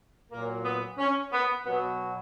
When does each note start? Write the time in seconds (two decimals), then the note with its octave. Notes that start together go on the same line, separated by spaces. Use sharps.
0.31 A#2 F#3 A#3
0.65 B3
0.98 C#4
1.32 B3
1.66 B2 F#3 B3